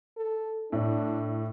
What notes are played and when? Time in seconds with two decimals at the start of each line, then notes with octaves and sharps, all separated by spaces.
0.17 A4
0.72 A2 D4